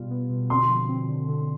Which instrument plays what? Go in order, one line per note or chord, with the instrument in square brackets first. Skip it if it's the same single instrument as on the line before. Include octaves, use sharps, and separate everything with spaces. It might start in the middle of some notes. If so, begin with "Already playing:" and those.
Already playing: [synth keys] B2 G3 F4
B3
B2
[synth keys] D3 [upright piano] C6
[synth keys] F3
C4
D3
D3